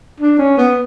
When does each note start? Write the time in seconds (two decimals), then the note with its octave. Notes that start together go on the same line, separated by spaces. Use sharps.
0.20 D4
0.39 C#4
0.57 B3